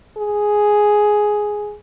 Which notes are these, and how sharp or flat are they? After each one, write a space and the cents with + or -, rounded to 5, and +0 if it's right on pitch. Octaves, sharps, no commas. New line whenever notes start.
G#4 +5